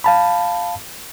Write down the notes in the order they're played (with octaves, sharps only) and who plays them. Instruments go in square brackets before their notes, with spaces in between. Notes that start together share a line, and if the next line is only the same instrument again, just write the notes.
[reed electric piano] F5 A5 B5